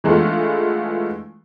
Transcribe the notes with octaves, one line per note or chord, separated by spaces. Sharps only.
E3 G#3 A3 B3 D4 F4